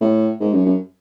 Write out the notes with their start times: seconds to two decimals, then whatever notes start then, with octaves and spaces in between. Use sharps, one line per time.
0.01 A2
0.40 G#2
0.52 F#2
0.65 F#2